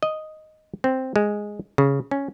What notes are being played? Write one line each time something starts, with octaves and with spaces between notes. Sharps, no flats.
D#5
C4
G#3
C#3
C#4